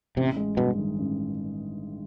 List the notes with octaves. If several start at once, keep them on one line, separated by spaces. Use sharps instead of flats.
A1 C3
G#3
G2 B2
D#3
A1